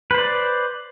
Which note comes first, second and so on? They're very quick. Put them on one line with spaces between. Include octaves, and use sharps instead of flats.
B4 C5 D5